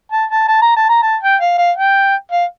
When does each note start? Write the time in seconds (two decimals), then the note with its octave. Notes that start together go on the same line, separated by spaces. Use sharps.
0.12 A5
0.31 A5
0.48 A5
0.62 A#5
0.76 A5
0.89 A#5
1.03 A5
1.23 G5
1.41 F5
1.58 F5
1.77 G5
2.32 F5